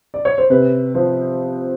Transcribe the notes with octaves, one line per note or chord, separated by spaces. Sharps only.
D5
C#5
C5
C3 B4
F3 C5